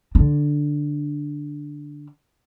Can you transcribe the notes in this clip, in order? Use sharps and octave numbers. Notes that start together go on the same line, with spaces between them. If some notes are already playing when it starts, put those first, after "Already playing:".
D3 D4